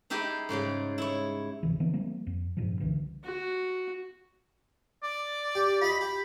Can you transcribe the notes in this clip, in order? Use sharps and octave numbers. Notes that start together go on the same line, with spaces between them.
D#4 E4 G4 G#4 D#5
G#2 C#3 G3 G#3
E4 C#5
D1 G1 C3 E3
D3 E3 B3 C4
F3 G3 A#3 C4
F2
G2 A#2 F3
C2 D3 E3
F#4
D5
G4
F4 D#5 B5
G4